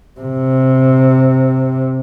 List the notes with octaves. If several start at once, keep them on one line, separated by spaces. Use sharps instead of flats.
C3